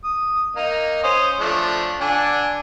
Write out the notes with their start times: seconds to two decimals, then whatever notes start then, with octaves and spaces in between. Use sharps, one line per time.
0.04 D#6
0.56 A#3 D#4
1.03 C#4 C5 D#6
1.40 F3 A3 D4
2.01 D3 D4 G#5